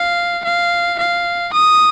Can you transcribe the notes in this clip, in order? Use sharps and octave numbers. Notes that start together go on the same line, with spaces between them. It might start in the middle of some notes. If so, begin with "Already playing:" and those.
Already playing: F5
F5
F5
D#6